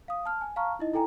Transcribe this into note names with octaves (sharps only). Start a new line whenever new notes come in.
F5 D#6
A5 F6
G#5
F5 A5 A#5 C#6 F6
D#4 E4 D#5
E4 A4 G5 G#5 A#5